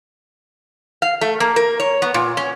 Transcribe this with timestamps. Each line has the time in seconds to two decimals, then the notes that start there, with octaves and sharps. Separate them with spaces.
1.02 F5
1.21 A3
1.40 A#3
1.56 A#4
1.80 C#5
2.02 B3
2.14 A#2
2.37 C#4